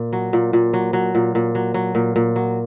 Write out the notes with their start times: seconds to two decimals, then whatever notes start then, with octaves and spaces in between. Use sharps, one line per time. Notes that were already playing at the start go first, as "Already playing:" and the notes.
Already playing: A#2
0.13 F#3
0.33 A#2
0.53 A#2
0.73 F#3
0.93 F#3
1.15 A#2
1.35 A#2
1.55 F#3
1.74 F#3
1.95 A#2
2.16 A#2
2.36 F#3